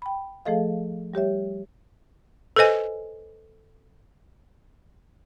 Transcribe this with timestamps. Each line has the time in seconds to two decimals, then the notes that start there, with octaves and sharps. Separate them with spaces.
0.02 G5 B5
0.45 F3 A3 G#4 A4 D#5 F5
1.14 G3 G4 C#5 E5
2.56 A4 B4 C5 D#5 G#5